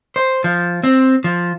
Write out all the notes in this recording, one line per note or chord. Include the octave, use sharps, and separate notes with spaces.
C5
F3
C4
F3